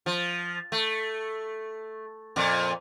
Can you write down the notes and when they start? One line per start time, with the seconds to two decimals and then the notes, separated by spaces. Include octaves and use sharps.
0.06 F3
0.72 A3
2.36 F2 A#2